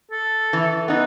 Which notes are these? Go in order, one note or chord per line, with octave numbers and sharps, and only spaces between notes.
A4
E3
B3 D#4